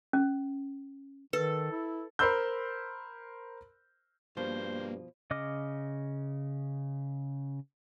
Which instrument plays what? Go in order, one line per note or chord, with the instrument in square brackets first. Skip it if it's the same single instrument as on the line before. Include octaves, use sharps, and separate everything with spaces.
[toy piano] C#4
[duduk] D#3 [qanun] A4 [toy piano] B4
[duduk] E4
[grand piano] A#4 C5 B5 C6 E6 G6
[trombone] G2 [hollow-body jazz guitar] B2 F3 [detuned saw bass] A#3 [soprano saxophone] C5
[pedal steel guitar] C#3 D#5 D6 F6